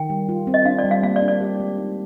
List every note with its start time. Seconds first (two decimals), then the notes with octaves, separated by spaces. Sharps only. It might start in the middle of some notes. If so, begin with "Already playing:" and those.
Already playing: D#3 G5
0.10 G3
0.29 F4
0.47 C4
0.54 D#5
0.65 D4 F5
0.79 D5
0.84 G3
0.91 F5
1.03 A#3 F5
1.16 D5
1.22 D4
1.28 D5
1.41 G4
1.60 G#3
1.78 D#4